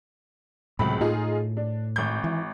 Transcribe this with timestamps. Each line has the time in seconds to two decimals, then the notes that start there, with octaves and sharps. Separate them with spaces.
0.79 C#2 A2 C3 F#3 B5
1.01 A2 D#4 F4 G#4
1.57 D4
1.96 G#1 G6
2.24 E3